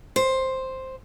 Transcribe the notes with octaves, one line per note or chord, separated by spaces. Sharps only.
C5